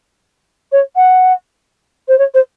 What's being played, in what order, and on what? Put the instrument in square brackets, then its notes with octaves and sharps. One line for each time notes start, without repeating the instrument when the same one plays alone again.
[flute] C#5
F#5
C5
C#5
C5